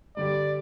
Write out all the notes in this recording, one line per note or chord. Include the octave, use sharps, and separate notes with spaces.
G2 D3 G3 D5